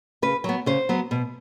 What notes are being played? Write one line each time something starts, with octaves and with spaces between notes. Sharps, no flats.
C#3 B4
F#3 B3
C#3 C5
F#3 B3
B2